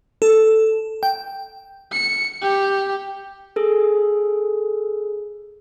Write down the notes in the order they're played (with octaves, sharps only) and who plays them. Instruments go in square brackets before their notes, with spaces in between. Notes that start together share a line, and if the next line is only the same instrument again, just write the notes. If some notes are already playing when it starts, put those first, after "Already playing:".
[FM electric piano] A4
G5
[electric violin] C#7
G4
[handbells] G#4 A4